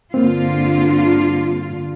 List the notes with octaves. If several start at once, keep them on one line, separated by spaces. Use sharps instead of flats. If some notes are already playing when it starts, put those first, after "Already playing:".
G2 D3 A#3 C4 F4